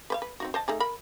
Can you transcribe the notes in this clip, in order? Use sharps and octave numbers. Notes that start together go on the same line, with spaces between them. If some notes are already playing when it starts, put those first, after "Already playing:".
B4 C5 F5
B4
C4 D#4 F#4
C5 D#5 A5
A3 D#4 G#4
A#4 B5